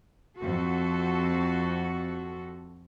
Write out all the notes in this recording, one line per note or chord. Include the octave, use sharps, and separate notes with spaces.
F2 F#4 A4